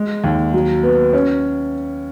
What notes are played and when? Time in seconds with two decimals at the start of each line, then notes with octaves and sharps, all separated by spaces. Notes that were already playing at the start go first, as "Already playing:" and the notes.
Already playing: G#3
0.24 D#2
0.53 F#3
0.83 B3
1.13 C#4